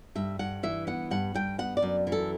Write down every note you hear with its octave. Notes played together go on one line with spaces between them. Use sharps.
G2 E5
G2 F#5
E3 E5
B3 F#5
G2 F#5
G2 G5
B3 F#5
D5
F#2
E3
A4